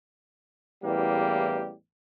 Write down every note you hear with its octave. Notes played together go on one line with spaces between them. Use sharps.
A1 E2 G3 A#3 G4